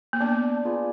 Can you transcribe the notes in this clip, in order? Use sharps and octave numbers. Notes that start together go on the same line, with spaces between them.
A#3
B3 D4
F4 G#4 B4